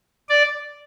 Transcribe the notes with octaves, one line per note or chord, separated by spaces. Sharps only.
D5